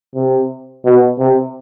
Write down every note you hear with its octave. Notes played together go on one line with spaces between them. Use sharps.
C3
B2
C3